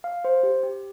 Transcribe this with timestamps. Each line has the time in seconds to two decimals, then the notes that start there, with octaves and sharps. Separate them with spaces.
0.04 F5
0.25 C5
0.43 G4
0.63 G4